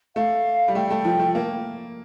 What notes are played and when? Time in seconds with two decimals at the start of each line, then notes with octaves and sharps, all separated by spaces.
0.16 A3 F5
0.68 G3
0.75 A3 G5
0.91 A3
1.05 F3
1.20 A3
1.35 A#3